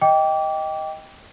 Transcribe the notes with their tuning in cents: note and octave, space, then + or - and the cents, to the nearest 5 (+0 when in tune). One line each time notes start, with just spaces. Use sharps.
D#5 +10 G5 +0 D6 -30